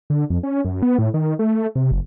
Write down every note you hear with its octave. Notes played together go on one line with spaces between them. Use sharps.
D3
F2
C#4
F#2
B3
A2
D#3
A3
C3
F#1